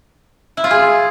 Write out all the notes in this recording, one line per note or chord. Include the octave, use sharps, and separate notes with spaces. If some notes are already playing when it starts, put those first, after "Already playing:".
E4
F4
G#4